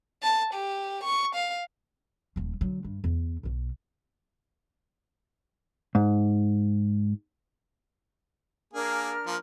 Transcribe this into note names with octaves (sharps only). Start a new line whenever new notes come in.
A5
G4
C#6
F5
D#1 F3
D3 F#3
G2
E2
B1 B2
G#2
A#3 D4 G#4 A#4 F6
F3 A#3